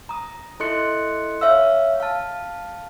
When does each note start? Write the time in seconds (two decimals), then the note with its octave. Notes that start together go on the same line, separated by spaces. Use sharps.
0.09 A#5 D#6
0.60 E4 A4 D#5 C6 F#6 C#7
1.41 C#5 E5 F5 E6
2.00 F5 A5